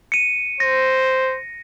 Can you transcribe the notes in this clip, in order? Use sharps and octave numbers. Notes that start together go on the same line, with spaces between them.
C#7 D#7
C5 A#6